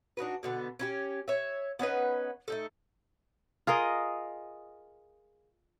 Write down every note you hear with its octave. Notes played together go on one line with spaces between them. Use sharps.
D4 D#4 F#4 B4
B2 D3 B3
C#4 E4 G4
C#5 E5
B3 C#4 D#4 B4
A3 D#4 A4
F4 G#4 A#4 D#5